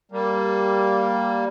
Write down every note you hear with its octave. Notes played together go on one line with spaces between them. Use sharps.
G3 A#3